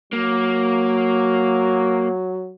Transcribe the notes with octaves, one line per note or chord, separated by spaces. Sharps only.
F#3 A#3